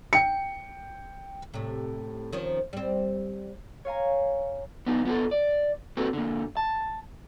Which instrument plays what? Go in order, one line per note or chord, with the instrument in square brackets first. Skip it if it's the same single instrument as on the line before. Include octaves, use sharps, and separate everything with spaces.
[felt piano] G5 C#7
[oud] A2 C3
D#3 F3 C#4
G3 C4
[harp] C#5 F5 G#5 A#5
[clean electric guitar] B3 D#4 F4
B3 F4 A4
D5
A#3 C4 F#4 G4 A4 B4
D3 A#3
A5